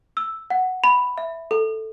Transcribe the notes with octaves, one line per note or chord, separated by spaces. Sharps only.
E6
F#5
B5
E5
A4